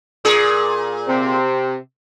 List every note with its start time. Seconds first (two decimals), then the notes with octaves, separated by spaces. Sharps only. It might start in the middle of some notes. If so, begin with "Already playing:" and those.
0.25 A#2 G#4
1.07 C3 C4